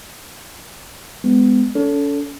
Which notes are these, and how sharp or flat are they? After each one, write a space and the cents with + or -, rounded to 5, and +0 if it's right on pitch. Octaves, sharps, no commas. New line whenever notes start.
G#3 -10 B3 +25
C#4 +40 A4 +0